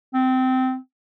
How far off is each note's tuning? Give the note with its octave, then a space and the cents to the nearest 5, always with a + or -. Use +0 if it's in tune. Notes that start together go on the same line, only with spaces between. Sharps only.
C4 -20